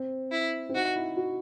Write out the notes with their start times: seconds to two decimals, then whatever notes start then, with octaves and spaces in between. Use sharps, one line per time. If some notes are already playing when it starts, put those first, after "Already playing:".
Already playing: C4
0.31 E4
0.69 C4
0.75 D#4 F#4
0.96 E4
1.17 F#4